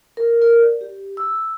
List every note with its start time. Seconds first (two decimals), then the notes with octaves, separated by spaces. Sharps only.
0.17 A#4
0.42 A#4
0.59 D5
0.81 G4
1.17 E6